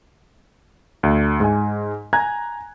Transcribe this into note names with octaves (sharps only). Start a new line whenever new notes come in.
D2
G#2 G#5
G#5 A#5 F#6 G#6